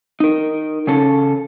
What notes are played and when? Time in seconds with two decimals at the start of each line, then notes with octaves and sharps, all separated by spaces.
0.20 D#4 A#4
0.87 C#3 C#4 A4